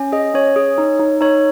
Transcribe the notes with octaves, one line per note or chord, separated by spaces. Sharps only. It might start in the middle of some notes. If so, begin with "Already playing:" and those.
Already playing: C#4
G#4 D#5
C#4 C#5
G#4
D#4
D#4
D#4 C#5